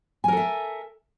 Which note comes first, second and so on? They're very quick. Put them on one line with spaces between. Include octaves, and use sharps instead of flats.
G#5 A#4 A4 E5